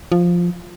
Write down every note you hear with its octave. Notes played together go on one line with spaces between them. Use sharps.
F3